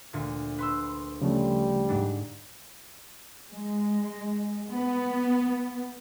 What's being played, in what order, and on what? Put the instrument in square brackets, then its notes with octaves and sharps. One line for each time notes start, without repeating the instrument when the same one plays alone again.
[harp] D2 A#2
B4 C6 E6
[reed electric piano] C#3 F3 A3 [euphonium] G3
[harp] G#2 D4
[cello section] G#3
B3